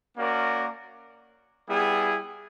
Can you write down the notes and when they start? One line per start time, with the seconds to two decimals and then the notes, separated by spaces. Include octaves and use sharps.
0.16 A#3 C#4 F#4 A#4 D5
1.67 G3 B3 E4 G#4